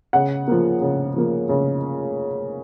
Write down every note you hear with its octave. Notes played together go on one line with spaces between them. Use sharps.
C#3 F#5
F3 A#3
C#3
F3 A#3
C#3